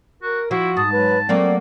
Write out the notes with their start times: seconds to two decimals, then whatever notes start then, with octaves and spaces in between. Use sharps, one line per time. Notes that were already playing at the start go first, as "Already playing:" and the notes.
0.22 F#4 A#4
0.51 F3 E4 F#4
0.77 G#2 A5 D#6
0.92 F#3 B4
1.29 F#3 A3 A#3 C4 D5